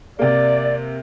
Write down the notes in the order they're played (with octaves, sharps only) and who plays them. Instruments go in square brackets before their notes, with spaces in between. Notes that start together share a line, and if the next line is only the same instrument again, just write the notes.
[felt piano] C3 A#3 [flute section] D5